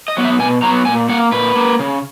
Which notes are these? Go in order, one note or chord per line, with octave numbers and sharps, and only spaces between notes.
D#5
F#3 B3
E5
B2 G#5
F#3 B3 A#5
A#2 G#5
A#3 F#5
A#2 B4
A#3
C#3